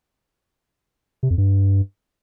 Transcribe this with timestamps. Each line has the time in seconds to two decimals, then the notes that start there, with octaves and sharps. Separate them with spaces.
1.23 C3
1.30 F2
1.38 G2